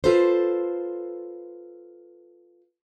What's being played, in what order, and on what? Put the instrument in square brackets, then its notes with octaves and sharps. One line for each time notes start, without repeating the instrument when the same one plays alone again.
[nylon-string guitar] F4 A4 B4 C5